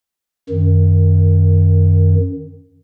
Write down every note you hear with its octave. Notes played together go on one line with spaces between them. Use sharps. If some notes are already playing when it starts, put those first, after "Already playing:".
F#2 D#3